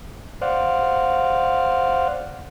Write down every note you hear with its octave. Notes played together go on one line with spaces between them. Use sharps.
C5 D5 F5 F#5